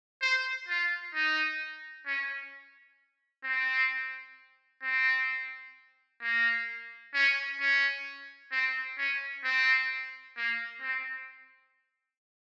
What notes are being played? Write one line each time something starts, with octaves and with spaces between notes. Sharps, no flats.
C5
F4
D#4
C#4
C4
C4
A#3
C#4
C#4
C4
C#4
C4
A#3
C4